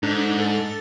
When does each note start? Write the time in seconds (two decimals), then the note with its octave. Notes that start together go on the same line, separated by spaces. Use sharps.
0.03 G#2 D4 D#4 A4
0.39 A4 A6